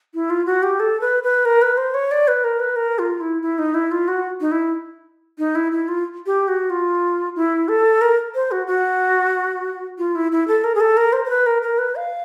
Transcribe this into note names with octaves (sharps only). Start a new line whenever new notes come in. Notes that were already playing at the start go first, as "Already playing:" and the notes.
E4
F4
F#4
G4
A4
B4
B4
A#4
B4
C5
C#5
D5
B4
A#4
B4
A#4
F4
E4
E4
D#4
E4
F4
F#4
D#4
E4
D#4
E4
E4
F4
G4
F#4
F4
E4
A4
A#4
C5
F#4
F#4
F4
E4
E4
A4
A#4
G#4
A4
A#4
C5
C5
B4
A#4
A#4
B4
F5